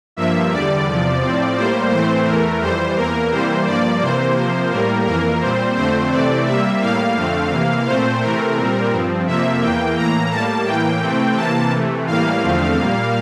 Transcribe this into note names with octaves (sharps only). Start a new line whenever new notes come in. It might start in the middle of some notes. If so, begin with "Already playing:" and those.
G2 F3 A#3 E5
E2 D3 G3 D5
E2 C3 F3
A2 F3 C4
A2 G3 A#3 C5
A2 E3 A3 C4 C5
E2 E3 A3 A#4
F2 E3 G3 C5
E2 E3 A#3 A#4
C3 E3 G3 A#3 C5
G2 F3 A#3 D5
C3 E3 A#3 C5
C3 F3 A#3
A2 G3 A#3 A#4
F2 E3 A#3 A#4
A#2 G3 C4 C5
F2 D3 A3 C4 C5
C3 E3 A3 C4 D5
C3 G3 A#3 E5
A2 G3 A#3 F5
F2 D3 A3 C4
C3 E3 A#3
A#2 A3 C4 C5
C3 E3 A3 C4 A#4
A#2 G3 C4
G2 F3 C4
F2 C3 F3 A#3 E5
E2 E3 A#3 G5
A2 E3 A#3 A#5
A2 G3 A#3 A5
A2 E3 A#3 G5
C3 E3 A3 C4
C3 E3 A#3 A5
C3 E3 A3
A2 E3 G3 A#3 F5
E2 D3 F3 A3 C4
A#2 G3 A#3